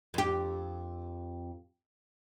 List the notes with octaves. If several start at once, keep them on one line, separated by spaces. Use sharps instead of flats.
F2 G4